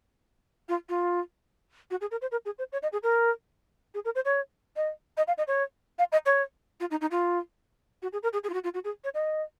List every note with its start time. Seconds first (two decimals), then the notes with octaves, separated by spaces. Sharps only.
0.69 F4
0.89 F4
1.91 F#4
2.01 G#4
2.11 A#4
2.21 C5
2.32 A#4
2.45 G#4
2.59 C5
2.72 C#5
2.83 D#5
2.92 G#4
3.03 A#4
3.94 G#4
4.05 A#4
4.15 C5
4.25 C#5
4.76 D#5
5.17 D#5
5.28 F5
5.38 D#5
5.48 C#5
5.99 F5
6.12 D#5
6.26 C#5
6.80 F4
6.91 D#4
7.01 D#4
7.11 F4
8.02 F#4
8.13 G#4
8.23 A#4
8.33 G#4
8.44 G#4
8.49 F4
8.54 F#4
8.64 F4
8.74 F#4
8.84 G#4
9.04 C#5
9.14 D#5